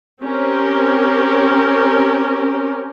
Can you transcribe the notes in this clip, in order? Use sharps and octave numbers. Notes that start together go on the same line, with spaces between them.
C4 C#4 G4 A#4